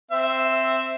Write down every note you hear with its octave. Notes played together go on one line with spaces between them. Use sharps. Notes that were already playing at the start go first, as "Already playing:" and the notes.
C4 E5